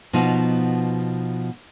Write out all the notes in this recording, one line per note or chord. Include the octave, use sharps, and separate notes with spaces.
B2 F3 B3 D#4 F4